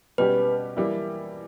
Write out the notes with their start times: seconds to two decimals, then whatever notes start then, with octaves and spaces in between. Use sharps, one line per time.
0.18 B2 G3 C#4 G4 B4
0.77 E3 G3 A#3 E4